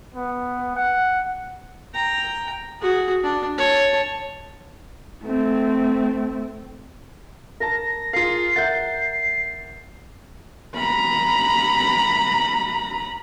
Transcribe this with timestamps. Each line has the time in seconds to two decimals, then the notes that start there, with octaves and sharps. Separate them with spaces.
0.14 B3
0.76 F#5
1.94 G5 A#5
2.81 F#4 G#4
3.23 D4
3.58 C#5 A5
5.24 A3 C4
7.60 A#4 A5 A#6
8.13 F4 G#4 A#4 F5 C7
8.56 A#4 E5 F#5 G6 A6
10.75 A#5 B5